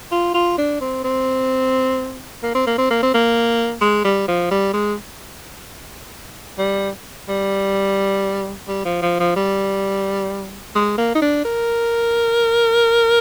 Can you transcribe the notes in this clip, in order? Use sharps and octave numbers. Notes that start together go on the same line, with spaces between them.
F4
F4
D4
C4
C4
A#3
C4
A#3
C4
A#3
C4
A#3
G#3
G3
F3
G3
G#3
G3
G3
G3
F3
F3
F3
G3
G#3
A#3
D#4
D4
A#4